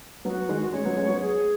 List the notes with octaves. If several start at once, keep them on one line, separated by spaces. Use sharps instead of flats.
F#3 B3 F#4
D#3 G#3
G#3 C#4 C#5
F#3 B3
G#3 C#4
F#3 B3
G#4